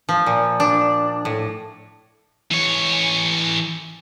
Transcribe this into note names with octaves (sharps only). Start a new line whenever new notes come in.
F3
A#2
D4
A2
E3 C#5